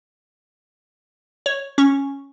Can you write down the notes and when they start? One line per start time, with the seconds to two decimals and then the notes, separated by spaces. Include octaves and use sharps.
1.46 C#5
1.78 C#4 C#6